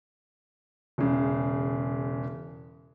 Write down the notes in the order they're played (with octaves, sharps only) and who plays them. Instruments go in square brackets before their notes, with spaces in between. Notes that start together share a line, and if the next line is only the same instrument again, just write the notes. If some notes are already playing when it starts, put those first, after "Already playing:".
[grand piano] E1 C#3